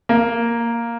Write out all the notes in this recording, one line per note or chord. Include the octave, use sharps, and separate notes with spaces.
A#3